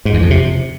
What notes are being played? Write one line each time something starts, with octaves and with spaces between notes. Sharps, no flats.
G#2
E2
F2
C3